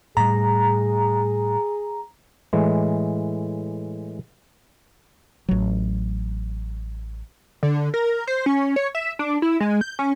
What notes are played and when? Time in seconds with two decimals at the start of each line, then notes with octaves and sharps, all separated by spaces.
0.17 A2 G3 G#4 A#5
2.53 A2 E3 G#3
5.49 A1 F#3
7.63 D3
7.94 A#4
8.27 C5
8.46 C#4
8.76 C#5
8.95 E5
9.19 D4
9.42 E4
9.60 G#3
9.81 G6
9.99 C#4